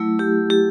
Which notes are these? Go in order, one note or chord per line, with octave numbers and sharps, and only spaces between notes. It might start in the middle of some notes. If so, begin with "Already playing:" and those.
Already playing: F#3 A3 E4
G4
G4